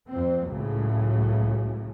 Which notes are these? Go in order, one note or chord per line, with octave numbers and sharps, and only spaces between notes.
F2 C4
C#2 A2 C#3 F#3